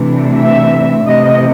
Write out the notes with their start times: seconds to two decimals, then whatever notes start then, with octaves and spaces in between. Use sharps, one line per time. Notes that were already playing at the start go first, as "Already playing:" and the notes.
Already playing: C3 E3 A3 D4
0.39 E5
1.07 C3 E3 A3 D#5